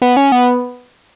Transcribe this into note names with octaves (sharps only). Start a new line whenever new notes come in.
B3
C#4
B3